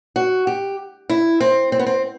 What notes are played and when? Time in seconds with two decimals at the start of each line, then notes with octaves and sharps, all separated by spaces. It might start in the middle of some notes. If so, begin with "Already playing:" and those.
0.16 F#4
0.47 G4
1.09 E4
1.40 C4
1.72 C4
1.79 B3
1.86 C4